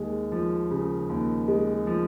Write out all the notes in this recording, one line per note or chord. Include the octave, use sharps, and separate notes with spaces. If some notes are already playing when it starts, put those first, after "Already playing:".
Already playing: D#2 G#3
F3
C#3
D#2
G#3
F3